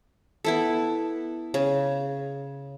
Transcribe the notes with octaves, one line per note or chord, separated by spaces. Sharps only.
B3 E4 A4
C#3